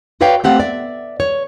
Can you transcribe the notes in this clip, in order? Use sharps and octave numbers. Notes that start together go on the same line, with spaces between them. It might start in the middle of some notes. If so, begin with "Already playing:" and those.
F#4 B4 C#5 D5 F5 G5
A3 B3 C4 G4 F5 F#5
D5 E5
C#5